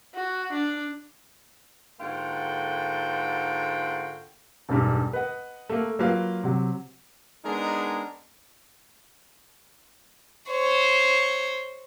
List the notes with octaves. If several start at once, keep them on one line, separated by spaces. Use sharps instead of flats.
F#4
D4
G#2 D3 A#3 F4 F#4 G5
E1 B1 G2 G4
B4 D#5 F#5
A3 A#3
F#3 A#3 F4 B4 F5
C3 F#3
G#3 B3 D4 D#4 G#4 A#4
C5 C#5